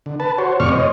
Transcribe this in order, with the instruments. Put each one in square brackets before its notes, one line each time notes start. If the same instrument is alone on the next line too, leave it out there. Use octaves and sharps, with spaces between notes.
[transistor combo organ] D3
B4 A5
F#4 C5 C#5
F2 A2 C3 D5 C#6 F6
C5 C#5 D#5